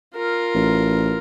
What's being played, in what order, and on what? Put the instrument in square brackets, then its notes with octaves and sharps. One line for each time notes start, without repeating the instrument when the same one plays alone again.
[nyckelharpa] F4 A#4
[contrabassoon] A1